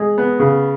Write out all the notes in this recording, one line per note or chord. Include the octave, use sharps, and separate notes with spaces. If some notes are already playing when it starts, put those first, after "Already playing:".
Already playing: G#3
B3
C#3